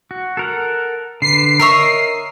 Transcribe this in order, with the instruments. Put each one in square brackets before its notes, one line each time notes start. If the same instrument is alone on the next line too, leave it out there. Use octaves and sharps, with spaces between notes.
[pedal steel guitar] F#4
A4 A#4 F#5
[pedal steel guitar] D3 B4 [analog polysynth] C7
[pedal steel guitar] A#4 D#5 [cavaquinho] C#5 E5 A#5